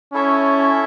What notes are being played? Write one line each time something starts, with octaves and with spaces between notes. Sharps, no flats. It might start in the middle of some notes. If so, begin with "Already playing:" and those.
C#4 E4 A4 C#5 E5